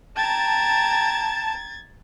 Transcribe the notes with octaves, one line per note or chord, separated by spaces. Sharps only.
G5 A5 A#5 G#6 A6